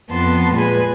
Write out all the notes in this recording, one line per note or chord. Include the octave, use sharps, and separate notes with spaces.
F2 B3 A5 C6
A#2 G#3 B4 G#5